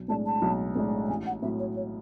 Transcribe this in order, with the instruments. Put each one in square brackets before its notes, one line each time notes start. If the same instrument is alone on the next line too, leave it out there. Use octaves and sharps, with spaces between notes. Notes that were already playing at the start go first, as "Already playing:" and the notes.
Already playing: [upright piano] B1
[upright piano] A2 G#3 D4 [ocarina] A5
[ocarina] A5
[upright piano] B1
A2 G#3 D4
[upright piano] A1 [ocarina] G#5
[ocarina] F#5
[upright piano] A2 F#3 [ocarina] E5
[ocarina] C#5
C#5